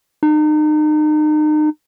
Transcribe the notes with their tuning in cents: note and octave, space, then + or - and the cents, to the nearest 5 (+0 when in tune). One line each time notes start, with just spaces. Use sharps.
D#4 -35